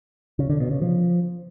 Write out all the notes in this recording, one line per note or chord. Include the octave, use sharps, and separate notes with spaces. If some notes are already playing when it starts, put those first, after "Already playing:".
C#3
D3
B2
C#3
F3